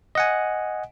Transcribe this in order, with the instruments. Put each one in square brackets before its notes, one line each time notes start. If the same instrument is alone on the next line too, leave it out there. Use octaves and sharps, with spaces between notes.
[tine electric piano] D#5 F#5 G#5